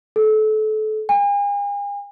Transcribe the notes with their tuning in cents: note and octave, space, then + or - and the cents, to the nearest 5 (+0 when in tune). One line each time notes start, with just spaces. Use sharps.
A4 -30
G#5 -45